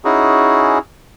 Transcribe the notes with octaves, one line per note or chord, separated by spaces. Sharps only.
C#4 D#4 E4 F#4 G#4